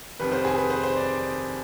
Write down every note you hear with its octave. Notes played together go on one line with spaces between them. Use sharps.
F1 F2 D#3 G3 B4
C5
G#4
B4
C5
C5
D5